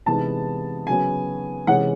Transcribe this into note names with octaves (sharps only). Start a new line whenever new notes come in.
C3 E3 G#3 B3 D#4 A5
C#3 F#3 B3 G#5
C3 E3 G#3 C#4 F#5